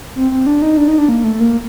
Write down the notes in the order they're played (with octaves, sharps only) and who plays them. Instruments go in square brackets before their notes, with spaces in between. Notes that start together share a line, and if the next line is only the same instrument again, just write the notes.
[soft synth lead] C4
C4
D4
D#4
D4
D#4
D4
A#3
A3
A#3